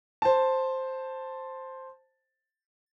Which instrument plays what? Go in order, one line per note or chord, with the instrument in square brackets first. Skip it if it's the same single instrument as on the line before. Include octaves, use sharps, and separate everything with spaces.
[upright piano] C5 A5